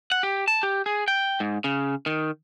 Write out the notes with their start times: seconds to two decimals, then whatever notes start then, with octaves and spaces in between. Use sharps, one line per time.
0.12 F#5
0.23 G4
0.48 A5
0.63 G4
0.86 G#4
1.08 G5
1.40 G#2
1.64 C#3
2.06 D#3